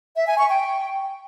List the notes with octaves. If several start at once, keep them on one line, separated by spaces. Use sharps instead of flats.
E5
G#5
C#6
G5